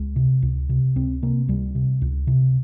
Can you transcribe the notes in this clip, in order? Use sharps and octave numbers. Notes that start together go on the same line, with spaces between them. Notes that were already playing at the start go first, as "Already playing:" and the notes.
Already playing: C#2 G#3
C3
C#2
C3
C#2 C4
C3 A#3
C#2 G3
C3
C#2
C3